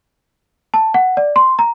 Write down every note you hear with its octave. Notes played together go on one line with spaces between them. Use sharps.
A5
F#5
D5
C6
A#5